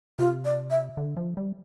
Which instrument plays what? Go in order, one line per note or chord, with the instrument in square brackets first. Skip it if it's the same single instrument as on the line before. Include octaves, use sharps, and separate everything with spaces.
[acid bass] C3 [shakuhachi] F4
[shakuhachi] D5
E5
[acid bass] D3
F3
G3